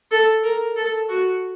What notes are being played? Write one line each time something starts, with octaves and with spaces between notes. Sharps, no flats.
A4
A#4
A4
F#4